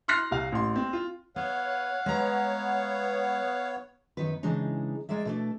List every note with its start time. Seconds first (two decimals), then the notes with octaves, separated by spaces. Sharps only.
0.08 C6 F6 F#6 A#6 C7
0.31 C2 F5
0.52 A1 C6
0.76 C4
0.93 F4
1.36 B3 C#5 F5 F#5
2.06 G#3 B3 C#5 A#5
4.17 F#2 D#3 B3 B4
4.43 C#3 E3 G#3 D4 D#4
5.09 G#3 A#4 D5 E5
5.25 B2 A3 D4